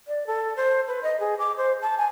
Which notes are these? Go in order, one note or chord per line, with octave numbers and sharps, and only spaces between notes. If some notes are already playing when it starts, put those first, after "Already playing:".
D5
A4
C5
B4
D#5
G#4
D6
C5
A5
G#5